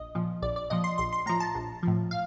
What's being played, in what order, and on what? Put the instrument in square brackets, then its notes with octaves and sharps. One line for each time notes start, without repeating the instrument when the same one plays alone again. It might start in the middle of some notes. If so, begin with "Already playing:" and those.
Already playing: [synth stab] A#1 D#5
A#2 F3
A#1 D5
D5
A#2 F3 D#5
C6
A#1 C6
C6
A2 F3 A#5
A5
A#1
A2 F3
F5